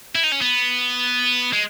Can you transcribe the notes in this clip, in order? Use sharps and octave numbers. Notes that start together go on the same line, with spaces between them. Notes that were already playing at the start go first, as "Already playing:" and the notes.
E4
D#4
C#4
B3
G#3